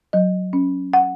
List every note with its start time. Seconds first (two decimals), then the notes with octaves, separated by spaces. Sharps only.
0.13 F#3 D#5
0.53 C#4
0.93 F#5